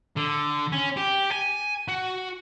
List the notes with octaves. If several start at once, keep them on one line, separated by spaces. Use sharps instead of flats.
D3
C#4
G4
G#5
F#4